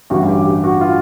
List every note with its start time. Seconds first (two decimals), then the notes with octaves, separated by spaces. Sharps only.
0.10 A1 G2 D3 F#4
0.29 G4
0.46 G4
0.64 F#4
0.81 F4